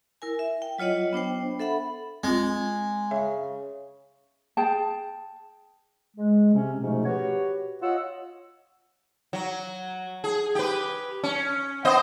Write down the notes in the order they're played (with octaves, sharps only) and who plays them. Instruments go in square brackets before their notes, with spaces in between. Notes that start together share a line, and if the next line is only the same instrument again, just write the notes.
[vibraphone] E4 A#4 G#5
E5
G5
F#3 F4 C#5 D#5 F#5
B3 D4 C5 G5
A4 E5 F#5 B5
[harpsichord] G#3 [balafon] C4 F4
[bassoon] C#3 [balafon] E5
[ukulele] G#4 G5 A5
[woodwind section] G#3
C3 C#4
G#2 B2 F3 A3 C#4
F#4 G4 B4 C#5
F4 C#5 D#5 F#5 E6
[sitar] F#3
G#4
G4 B4
C#4
B3 C5 D#5